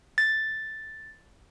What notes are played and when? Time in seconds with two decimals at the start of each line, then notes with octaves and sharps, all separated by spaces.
0.18 A6